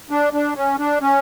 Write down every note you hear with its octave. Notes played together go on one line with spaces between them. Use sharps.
D4
D4
C#4
D4
C#4